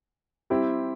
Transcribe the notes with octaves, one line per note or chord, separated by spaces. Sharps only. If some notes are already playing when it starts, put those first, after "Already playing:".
G3 C4 E4 G4